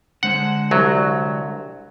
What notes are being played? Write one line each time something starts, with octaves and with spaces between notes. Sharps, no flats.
D3 G#3 C5 F#5
C2 F#3